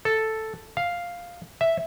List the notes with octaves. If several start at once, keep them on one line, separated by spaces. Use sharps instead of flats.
A4
F5
E5